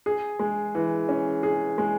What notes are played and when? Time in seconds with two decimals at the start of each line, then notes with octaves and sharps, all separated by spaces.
0.06 G#4
0.39 G#3
0.75 E3
1.09 C#4
1.43 G#4
1.78 G#3